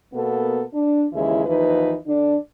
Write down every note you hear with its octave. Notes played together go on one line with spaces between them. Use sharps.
B2 A#3 B3 A4 A#4
D4
D#2 C#3 E3 G#3 E4
D#2 E3 F3 D#4 B4
D3 D4